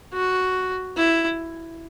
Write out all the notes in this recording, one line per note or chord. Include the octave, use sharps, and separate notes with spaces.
F#4
E4